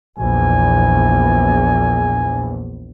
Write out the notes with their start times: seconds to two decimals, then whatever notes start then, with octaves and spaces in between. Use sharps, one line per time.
0.18 A#1 E2 G#5